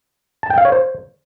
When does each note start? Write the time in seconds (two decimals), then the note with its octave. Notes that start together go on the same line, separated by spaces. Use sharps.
0.43 A5
0.50 G5
0.58 F5
0.65 C#5
0.72 C5